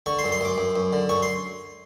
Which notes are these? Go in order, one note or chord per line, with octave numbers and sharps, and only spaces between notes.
D3 C#6
C6
F#2
C6
F#2 D6
F#2
F#2
D3
F#2 C#6
C6